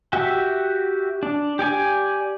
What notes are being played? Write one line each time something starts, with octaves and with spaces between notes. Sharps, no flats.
F#4 G4 E5
D4
G4 D5 G#5